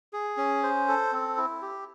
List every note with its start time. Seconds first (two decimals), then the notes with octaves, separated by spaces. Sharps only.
0.13 G#4
0.37 C#4
0.63 C5
0.88 A4
1.13 C4
1.37 E4
1.62 G4